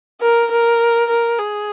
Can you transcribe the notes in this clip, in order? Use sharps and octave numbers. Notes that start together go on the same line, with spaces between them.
A#4
A#4
A#4
G#4